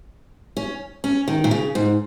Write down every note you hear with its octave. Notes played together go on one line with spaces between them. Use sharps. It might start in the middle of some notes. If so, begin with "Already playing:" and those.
C#4
C#4
D#3
A#2
C#3
G#2